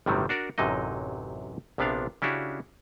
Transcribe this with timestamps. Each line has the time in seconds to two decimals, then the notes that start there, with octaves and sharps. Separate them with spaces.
0.06 G1 A2 C3 D#3 F#3 G3
0.29 D4 F#4 A#4 D5
0.58 A1 F#2 C3 F#3 D#4 D#5
1.78 A#1 C3 F3 B3 D4 F5
2.22 C#3 C#4 D4 E4 F#4 G4